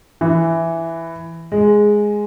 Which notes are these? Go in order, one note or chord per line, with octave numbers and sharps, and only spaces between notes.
E3
G#3